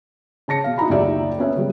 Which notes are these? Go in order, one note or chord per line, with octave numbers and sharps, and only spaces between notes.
C#3 A5 A#6 C#7
B2 F5
D#4 E4 F#4 A#5 B5
F#1 C#2 D#3 G4 D5 E5
B3 C#4 E5
C#3 F#3 G3 B3